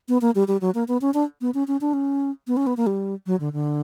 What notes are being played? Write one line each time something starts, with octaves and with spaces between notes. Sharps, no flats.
B3
A#3
G3
G3
F#3
A#3
B3
C#4
D4
B3
C#4
C#4
D4
C#4
B3
C#4
B3
A#3
G3
F#3
D3
D3